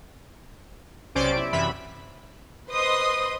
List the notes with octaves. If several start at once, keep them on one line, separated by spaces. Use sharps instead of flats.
B1 C3 C#4 C5 D5 D7
E4
F#2 C3 E3 E5 B5
B4 C5 D#5 C6 D#6